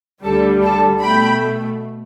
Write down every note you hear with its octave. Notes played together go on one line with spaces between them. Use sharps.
D2 D3 G3 A4
A4
B2 A3 G5 B5